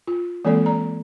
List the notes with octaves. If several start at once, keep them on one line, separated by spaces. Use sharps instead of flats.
F4
E3 G#3 A#3 C4 A4 D5
D5 A#5